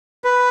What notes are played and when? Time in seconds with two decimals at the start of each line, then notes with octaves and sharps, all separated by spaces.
0.24 B4